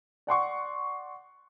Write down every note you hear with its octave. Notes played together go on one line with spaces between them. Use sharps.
D5 F#5 C6 C#6